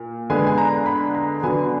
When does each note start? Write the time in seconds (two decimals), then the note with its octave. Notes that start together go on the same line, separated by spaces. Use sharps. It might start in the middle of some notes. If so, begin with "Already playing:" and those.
Already playing: A#2
0.30 D3 G#3 B3 G#5
0.47 G#5
0.58 A#5
0.86 B5
1.14 A#5
1.43 D3 F#3 B3 G#5